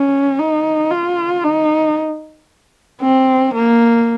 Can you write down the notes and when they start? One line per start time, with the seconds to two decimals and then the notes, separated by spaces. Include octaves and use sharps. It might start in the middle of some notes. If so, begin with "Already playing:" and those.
Already playing: C#4
0.39 D#4
0.91 F4
1.44 D#4
3.02 C4
3.55 A#3